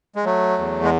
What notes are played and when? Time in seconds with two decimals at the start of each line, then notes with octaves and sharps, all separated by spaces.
0.15 G#3
0.25 F#3 A3
0.58 E2
0.84 G#3